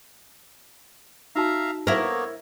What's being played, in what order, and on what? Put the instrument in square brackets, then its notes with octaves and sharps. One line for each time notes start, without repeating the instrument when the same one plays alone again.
[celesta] D#4 F#4 A5 [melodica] E5 F5 A#5
[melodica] A#3 B3 C#5 [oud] E4 A#4